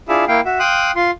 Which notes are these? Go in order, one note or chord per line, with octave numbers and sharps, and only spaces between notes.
D4 E4 F4 G#4 E5
A#3 E4 F5 G5
F#4 E5
F5 G5 C6 D#6 F#6
F4 C6